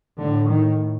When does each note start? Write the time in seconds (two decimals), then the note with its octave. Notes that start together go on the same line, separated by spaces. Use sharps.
0.19 A2 D3
0.50 D#3